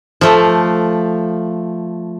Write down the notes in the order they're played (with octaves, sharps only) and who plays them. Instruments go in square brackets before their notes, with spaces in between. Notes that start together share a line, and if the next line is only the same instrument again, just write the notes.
[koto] F3 A3